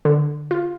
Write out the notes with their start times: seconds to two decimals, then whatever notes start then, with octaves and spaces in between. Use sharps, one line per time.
0.05 D3
0.51 F4